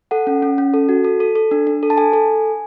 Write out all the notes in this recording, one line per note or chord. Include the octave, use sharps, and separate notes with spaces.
A4 F#5
C#4
C#4
C#4
A4
F#4
A4
A4
A4
D4
D4
A4
A5
A4 G#5
A4